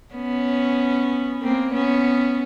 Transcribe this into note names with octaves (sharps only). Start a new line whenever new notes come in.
B3 C#4
A#3 C4
B3 C#4